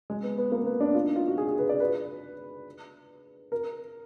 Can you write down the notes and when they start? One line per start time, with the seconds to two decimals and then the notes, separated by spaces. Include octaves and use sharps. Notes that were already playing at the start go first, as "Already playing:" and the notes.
0.10 G#3
0.23 B3
0.38 B3
0.52 A#3
0.66 B3
0.80 D4
0.95 F4
1.05 D#4
1.16 F4
1.27 F#4
1.38 G#4
1.48 G#4
1.59 B4
1.69 D5
1.80 B4
3.52 A#4